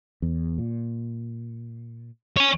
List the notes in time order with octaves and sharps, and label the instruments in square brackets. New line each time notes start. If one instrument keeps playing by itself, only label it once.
[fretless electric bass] E2
A#2
[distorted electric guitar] C#5 G#5